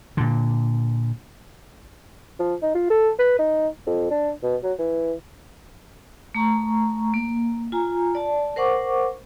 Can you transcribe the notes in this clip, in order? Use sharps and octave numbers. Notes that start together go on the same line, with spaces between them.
A#2 D3
F3
D#4
F4
A4
B4
D#4
F2
D4
B2
F#3
E3
A3 A#5 C#6
A#3
F4 G#5 A#5
D5 A5
A#4 C5 F#5 C#6 D6